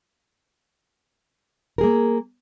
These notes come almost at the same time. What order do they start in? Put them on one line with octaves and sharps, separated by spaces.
A#4 G#4 A#3